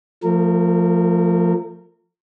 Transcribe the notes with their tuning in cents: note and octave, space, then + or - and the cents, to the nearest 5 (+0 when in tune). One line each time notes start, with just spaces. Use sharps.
F3 +0 A3 +20 A#4 -25